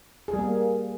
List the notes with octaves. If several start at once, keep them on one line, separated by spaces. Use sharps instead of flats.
G#4
G3
A#3